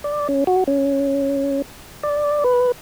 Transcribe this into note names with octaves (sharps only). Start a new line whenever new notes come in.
D5
C#4
F#4
C#4
D5
B4